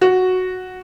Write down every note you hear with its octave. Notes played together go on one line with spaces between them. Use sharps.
F#4